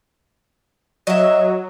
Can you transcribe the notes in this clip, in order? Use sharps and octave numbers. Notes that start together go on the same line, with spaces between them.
F#3 D#5 E5